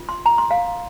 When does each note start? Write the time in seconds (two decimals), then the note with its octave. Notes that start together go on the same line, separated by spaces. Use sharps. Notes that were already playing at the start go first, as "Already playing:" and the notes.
Already playing: F4
0.09 C6
0.26 A#5
0.38 C6
0.51 F5